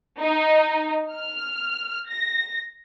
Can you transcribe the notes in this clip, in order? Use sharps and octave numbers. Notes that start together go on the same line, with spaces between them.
D#4
F6
A#6